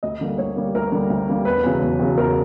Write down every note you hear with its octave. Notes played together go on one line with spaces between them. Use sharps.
D2 D#5
D3 G3 A#3
D2 C#5
D3 G3 A#3
D2 A#4
D3 G3 A#3
D2
D3 G3 A#3
E1 B4
E2 C#3 F#3
E1
E2 C#3 F#3
E1 A#4